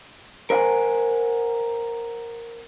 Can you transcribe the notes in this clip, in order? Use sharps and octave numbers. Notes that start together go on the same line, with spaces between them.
A#4 C5 F5 F#5 G#5